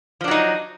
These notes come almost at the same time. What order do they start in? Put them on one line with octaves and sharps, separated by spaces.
F3 D4 F#3 D#4